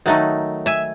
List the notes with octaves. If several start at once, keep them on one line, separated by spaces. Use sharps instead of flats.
D#3 F#3 A3 D#4
E5 G#5